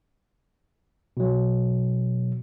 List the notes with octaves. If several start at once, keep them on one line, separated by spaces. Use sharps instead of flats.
B2 F#3